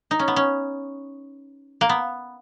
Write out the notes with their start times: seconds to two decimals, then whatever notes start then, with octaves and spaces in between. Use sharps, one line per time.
0.11 D#4
0.19 C#4
0.28 B3
0.36 C#4
1.81 A#3
1.89 B3